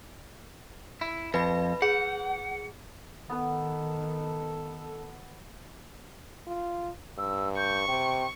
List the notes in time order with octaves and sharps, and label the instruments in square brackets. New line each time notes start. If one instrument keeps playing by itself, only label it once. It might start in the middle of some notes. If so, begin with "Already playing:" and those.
[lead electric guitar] E4
[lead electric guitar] F2 [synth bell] B4 B5
[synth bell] G#4 [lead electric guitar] F#5
[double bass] D#3 [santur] B3 B4 [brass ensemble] A4
[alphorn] F4
[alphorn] G2 [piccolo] E6
[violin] C#6 [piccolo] G6
[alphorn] C3 [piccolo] G5